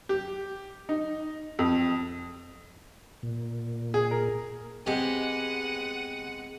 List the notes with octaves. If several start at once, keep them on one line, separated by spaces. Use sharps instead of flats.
G4
D#4
F2
A#2
G#4
A#4
G#3 B3 C4 G4 F#5 D#7